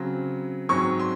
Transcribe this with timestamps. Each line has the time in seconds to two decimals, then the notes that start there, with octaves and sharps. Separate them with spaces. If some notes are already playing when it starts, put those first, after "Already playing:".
Already playing: C#3 F#3 C4
0.69 G#2 F#3 C4 C#6
0.99 C6